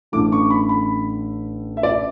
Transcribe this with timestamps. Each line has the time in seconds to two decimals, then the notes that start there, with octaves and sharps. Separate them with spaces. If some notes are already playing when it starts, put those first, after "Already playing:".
0.12 A1 A2 E3 A3 D4 D6
0.32 C#6
0.50 B5
0.69 B5
1.77 E5
1.83 D5